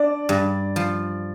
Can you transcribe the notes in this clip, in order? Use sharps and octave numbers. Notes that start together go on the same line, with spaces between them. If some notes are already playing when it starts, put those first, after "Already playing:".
Already playing: D4 D5
G2
F3